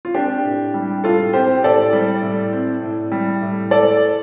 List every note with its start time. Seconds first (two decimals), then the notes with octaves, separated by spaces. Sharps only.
0.05 F4
0.14 C4 D4 G4
0.45 A2
0.74 G3
1.04 A2 F4 A4
1.33 C4 G4 C5
1.63 A2 A4 D5
1.93 G3
2.23 A2
2.52 C4
2.82 A2
3.12 G3
3.42 A2
3.71 A3 A4 D5